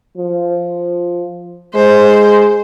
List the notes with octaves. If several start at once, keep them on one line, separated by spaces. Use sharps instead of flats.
F3
G#3 C5